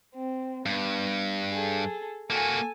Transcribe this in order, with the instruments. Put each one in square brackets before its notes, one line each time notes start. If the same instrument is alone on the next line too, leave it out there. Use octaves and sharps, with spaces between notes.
[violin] C4
[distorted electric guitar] G2 [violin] B3
[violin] G#4 A4
[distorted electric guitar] A#3 F#4 [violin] A4 G#5